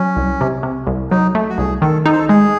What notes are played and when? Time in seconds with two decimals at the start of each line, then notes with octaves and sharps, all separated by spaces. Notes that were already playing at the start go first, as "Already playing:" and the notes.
Already playing: F#3 C#4
0.17 C2
0.41 C3
0.63 C3
0.87 C2
1.11 F#3 D#4
1.35 A3
1.50 F#4
1.58 C2 G#4
1.82 D#3 A4
2.05 D#4 A4
2.12 C5
2.19 A4
2.28 G#3 G#4